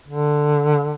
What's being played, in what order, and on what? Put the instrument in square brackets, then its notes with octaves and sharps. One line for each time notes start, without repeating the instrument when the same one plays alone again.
[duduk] D3